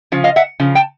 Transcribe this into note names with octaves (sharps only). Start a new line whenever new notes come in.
C#3 F3
D#5 F5
E5 F#5
C#3 F3
G5 A5